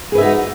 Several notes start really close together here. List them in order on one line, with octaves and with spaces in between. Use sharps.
G#4 B4 E5 D#4 F#4